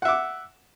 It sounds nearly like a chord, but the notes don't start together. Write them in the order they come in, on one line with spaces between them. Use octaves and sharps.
F#5 E5 D6